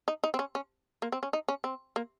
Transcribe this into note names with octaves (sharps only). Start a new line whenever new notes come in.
D#4
D#4
C4
C#4
C#4
A#3
C4
C#4
D#4
C#4
C4
A#3